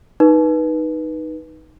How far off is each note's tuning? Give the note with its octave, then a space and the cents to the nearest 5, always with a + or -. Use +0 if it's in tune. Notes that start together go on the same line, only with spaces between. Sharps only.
D#4 +0 B4 -15